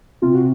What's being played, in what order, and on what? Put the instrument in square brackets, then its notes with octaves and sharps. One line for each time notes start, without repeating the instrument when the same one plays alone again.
[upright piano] C3 [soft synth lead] F4
[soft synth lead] F#4